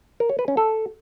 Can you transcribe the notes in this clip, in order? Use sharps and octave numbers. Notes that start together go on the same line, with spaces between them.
A#4
C#5
B4
C#4
A4